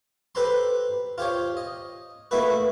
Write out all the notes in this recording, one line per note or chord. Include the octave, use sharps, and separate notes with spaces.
G4 A4 B4 C5 A#5 C6
F4 G4 C5 C#5
D#5
A3 A#3 D#4 E4 F#4 B4